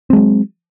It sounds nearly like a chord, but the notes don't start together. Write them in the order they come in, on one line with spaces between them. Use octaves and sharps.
C4 G#3 F#3